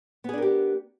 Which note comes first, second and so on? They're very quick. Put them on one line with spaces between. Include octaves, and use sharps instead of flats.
B3 G#4 D4 A#4 G4